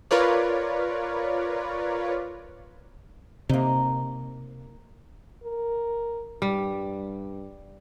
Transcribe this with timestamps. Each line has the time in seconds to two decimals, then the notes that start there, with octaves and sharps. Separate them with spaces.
0.11 F4 A#4 B4 C#5 D5
3.49 C3 A#3 D#4
5.44 A#4
6.42 G2 G3